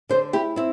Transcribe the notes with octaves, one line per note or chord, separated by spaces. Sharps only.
D3 C5
E4 G4
C4 E4